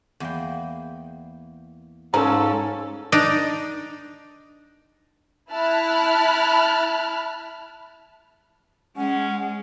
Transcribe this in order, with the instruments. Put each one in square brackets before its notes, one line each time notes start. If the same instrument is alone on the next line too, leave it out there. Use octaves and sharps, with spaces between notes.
[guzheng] E2 A#3 G5
[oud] G#2 [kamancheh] C#4 A4 [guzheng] F4 [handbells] A#5
[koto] D4 D#4
[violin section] E4 A5 B5 F6 F#6
[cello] G#3 [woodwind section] C#4 [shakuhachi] F#5